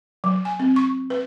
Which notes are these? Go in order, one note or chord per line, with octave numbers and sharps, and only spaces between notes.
F#3
G#5
C4
C#6
B4